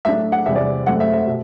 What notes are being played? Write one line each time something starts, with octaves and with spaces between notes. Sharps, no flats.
A2 F#3 A3 D4 E5
F#5
E2 C3 G3 E5
D5
F#2 F#3 A3 C4 F#5
E5
E5
B2